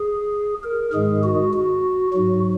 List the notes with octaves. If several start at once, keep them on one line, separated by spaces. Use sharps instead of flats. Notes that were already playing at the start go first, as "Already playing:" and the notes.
Already playing: G#4
A#4
G#2 D#3 G#3 G#4
F#4
F#4
G#2 F#3 F#4